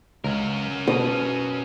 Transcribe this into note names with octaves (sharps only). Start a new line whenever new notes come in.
C#2 C#4 A#4
B2 D#6